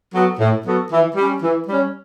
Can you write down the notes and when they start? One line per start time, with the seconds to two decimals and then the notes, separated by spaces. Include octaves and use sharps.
0.13 F#3 B3 F#4 A4
0.39 A2
0.65 F#3 B3 F#4 A4
0.91 E3
1.15 G3 C#4
1.42 E3
1.67 G3 C#4